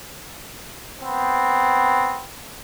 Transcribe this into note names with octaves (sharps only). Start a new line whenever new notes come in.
B3 C4